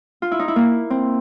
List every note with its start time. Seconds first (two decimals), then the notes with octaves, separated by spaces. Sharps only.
0.22 F4
0.31 E4
0.39 D#4
0.48 E4
0.56 A#3
0.90 C4